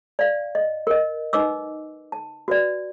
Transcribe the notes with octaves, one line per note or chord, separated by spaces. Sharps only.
D5 F5
D#5
A#4 D#5
D#4 B4 D#5 D6 E6
A5
F#4 B4 D5